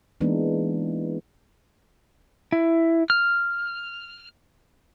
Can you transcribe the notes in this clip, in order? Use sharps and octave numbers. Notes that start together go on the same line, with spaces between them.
E3 G#3 A#3 B3 D4 D#4
E4
F6